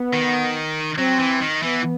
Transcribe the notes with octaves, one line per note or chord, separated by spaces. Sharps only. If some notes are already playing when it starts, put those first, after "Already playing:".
Already playing: B3
D#3
F#3 C4
E3
D#3
E3 B3